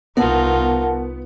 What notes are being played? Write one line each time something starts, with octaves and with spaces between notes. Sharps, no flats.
C2 B3 D#4 F4 A#4 F#5 A5